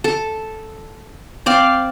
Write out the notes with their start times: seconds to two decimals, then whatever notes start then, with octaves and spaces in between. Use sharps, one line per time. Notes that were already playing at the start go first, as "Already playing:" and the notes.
0.04 A4
1.46 C4 D5 F5